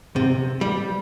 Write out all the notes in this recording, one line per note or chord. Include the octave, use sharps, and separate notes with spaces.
C3
G3